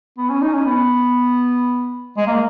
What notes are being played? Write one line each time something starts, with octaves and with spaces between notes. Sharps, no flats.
B3
C#4
D#4
C#4
B3
G#3
A#3